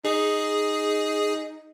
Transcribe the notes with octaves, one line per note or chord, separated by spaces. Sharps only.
D#4 G#4